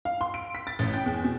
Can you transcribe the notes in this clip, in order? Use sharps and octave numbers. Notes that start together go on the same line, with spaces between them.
F5
C6
D7
B6
A6
A1
G5
E2
B2